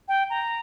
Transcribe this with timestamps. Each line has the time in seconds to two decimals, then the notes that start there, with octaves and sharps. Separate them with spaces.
0.08 G5
0.30 A#5